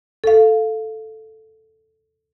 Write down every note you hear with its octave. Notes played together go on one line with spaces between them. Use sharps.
A4 F5